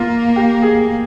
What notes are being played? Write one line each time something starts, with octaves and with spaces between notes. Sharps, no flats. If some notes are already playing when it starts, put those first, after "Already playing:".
Already playing: A#3 F4
G4
G#4